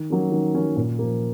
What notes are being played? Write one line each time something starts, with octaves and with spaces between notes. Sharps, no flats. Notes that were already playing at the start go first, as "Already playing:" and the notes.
Already playing: D#3
F#3 A#3 C#4
D#3
F#3 A#3 C#4
A#2
F3 A#3